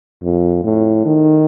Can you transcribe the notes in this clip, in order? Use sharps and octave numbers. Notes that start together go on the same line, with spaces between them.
F2
A2
D#3